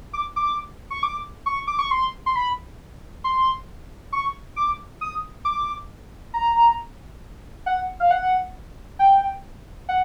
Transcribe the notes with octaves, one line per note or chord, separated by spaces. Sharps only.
D6
D6
C#6
D6
C#6
D6
C#6
C6
C6
B5
C6
C#6
D6
D#6
D6
A#5
F#5
F5
F#5
G5
F#5